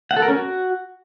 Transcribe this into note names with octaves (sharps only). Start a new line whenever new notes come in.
F#5
A4
A#4
C#4
F#4